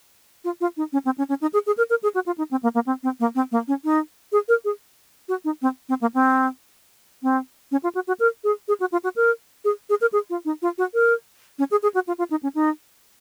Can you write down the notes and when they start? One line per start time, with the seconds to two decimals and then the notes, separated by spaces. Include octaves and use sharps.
0.44 F4
0.61 F4
0.77 D#4
0.93 C#4
1.05 C4
1.18 C#4
1.29 C#4
1.41 D#4
1.53 G#4
1.66 G#4
1.77 A#4
1.90 A#4
2.03 G#4
2.14 F#4
2.26 F4
2.38 D#4
2.51 C4
2.63 A#3
2.75 A#3
2.86 C4
3.03 C4
3.20 A#3
3.35 C4
3.51 A#3
3.68 C#4
3.84 D#4
4.32 G#4
4.48 A#4
4.65 G#4
5.28 F#4
5.44 D#4
5.62 C4
5.89 C4
6.01 A#3
6.14 C4
7.23 C4
7.71 C#4
7.83 F4
7.95 F#4
8.07 F#4
8.20 A#4
8.44 G#4
8.68 G#4
8.80 F#4
8.92 F4
9.04 F#4
9.16 A#4
9.64 G#4
9.89 G#4
10.01 A#4
10.12 G#4
10.30 F4
10.45 D#4
10.62 F4
10.78 F#4
10.94 A#4
11.59 C#4
11.71 G#4
11.83 G#4
11.94 F#4
12.07 F4
12.18 F4
12.31 D#4
12.43 C#4
12.55 D#4